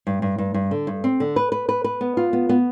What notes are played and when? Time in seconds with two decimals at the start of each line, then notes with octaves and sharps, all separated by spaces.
0.07 G2
0.22 G2
0.38 G2
0.54 G2
0.71 D3
0.87 G2
1.04 C4
1.20 D3
1.36 B4
1.52 B4
1.69 B4
1.84 B4
2.01 B3
2.17 F4
2.33 B3
2.49 B3